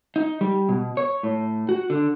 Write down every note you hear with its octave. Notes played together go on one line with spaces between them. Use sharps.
D#4
G3
B2
C#5
A2
F#4
D3